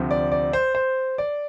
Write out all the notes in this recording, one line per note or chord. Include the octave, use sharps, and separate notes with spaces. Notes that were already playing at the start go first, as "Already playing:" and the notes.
Already playing: D2 C3 F3
D5
D5
C5
C5
D5